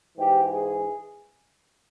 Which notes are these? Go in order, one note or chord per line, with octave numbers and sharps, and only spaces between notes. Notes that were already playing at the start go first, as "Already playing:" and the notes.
G#2 E3 G4
G#4